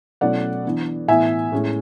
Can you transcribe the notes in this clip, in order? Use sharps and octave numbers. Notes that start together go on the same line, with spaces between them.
B2 F#3 A3 C#4 E4 D5 F#5
E3 B3 D4
A2 E3 B3 E4 E5 G#5
A2 G#3 C#4